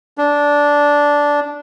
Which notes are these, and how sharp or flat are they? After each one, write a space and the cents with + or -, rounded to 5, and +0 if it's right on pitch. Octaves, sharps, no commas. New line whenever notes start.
D4 -10